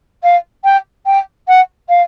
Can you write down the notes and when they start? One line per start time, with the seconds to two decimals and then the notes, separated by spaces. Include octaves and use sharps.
0.23 F5
0.64 G5
1.06 G5
1.48 F#5
1.89 F5